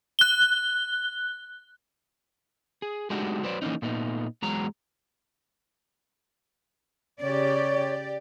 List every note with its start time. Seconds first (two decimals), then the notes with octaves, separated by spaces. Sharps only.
0.19 F#6 G7
2.82 G#4
3.10 G#3 A3 D4 D#4 F#4 G4
3.44 F#3 B4 C5 D5
3.62 E3 A#3 C4 C#4 D#4
3.82 A#2 A3 B3 D#4
4.42 E2 F#3 G#3 A#5
7.22 C#3 G4 C#5 D5